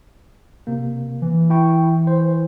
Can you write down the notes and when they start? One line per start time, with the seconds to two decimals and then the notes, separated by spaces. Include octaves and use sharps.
0.67 C3 A#3
1.22 E3
1.50 E4 G5 C#6
2.07 C5